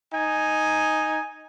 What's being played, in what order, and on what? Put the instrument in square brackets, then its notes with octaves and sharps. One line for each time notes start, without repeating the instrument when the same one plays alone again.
[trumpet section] D#4 G#5